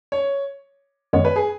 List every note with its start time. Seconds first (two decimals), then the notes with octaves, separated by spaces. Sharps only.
0.12 C#5
1.13 F#2 D#3 G#3 B3 C#5
1.25 B4
1.36 G#4